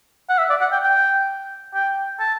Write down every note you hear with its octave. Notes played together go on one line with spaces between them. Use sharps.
F#5
E5
D5
F#5
G5
G5
G5
A5